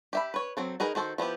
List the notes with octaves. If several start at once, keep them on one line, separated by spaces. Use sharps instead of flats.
G4 E5 B5
B4 C#5
F#3 C4 A4
D#4 G#4 A#4 B4 D#5
D#3 F#4 A4 C5
F3 B3 E4 G4